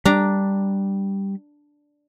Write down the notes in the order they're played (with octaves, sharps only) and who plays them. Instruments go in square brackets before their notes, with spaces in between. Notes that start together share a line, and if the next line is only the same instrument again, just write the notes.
[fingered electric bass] G3 [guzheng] D4 A#5